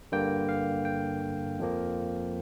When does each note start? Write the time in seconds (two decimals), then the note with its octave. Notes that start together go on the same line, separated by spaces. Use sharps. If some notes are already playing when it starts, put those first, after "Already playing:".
0.12 G2 D3 A#3 G5
0.49 F5
0.85 G5
1.59 F2 F3 A#3